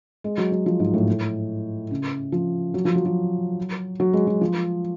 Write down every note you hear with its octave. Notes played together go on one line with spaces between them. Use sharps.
G#3
F#3
F#3
F3
G#2
A2
A2
C#3
F3
F#3
F3
F#3
F#3
F#3
G#3
F#3
F3